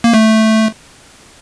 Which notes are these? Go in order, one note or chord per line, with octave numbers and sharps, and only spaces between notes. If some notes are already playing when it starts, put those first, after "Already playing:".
A#3
A3